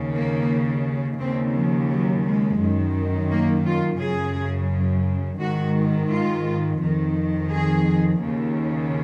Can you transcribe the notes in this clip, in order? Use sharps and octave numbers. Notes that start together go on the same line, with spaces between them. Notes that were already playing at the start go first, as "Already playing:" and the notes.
Already playing: D#2 C#3
A#3
D#2 C#3 C4
F3
F#3
G#3
F#2 D#3
A#3
F4
F#2 C#3 G#4
G#2 D#3 F#4
F4
F2 D#3
G#4
D#2 C#3